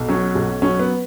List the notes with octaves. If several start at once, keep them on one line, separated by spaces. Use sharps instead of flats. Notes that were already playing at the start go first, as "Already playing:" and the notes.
Already playing: B1
F#3 C#4
B1
F#3 C#4
B3